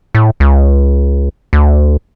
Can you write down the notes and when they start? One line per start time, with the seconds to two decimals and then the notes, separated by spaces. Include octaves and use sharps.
0.15 A2
0.40 C#2
1.53 D2